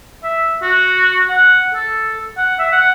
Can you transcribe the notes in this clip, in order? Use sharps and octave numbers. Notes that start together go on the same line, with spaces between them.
E5
F#4
F#5
A4
F#5
E5
F#5